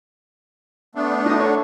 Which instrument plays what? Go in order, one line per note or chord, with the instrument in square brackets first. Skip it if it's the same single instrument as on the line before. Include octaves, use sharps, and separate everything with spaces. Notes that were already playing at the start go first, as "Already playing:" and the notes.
[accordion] A3 B3 D4
[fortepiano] D#4 D#6
A4 C#5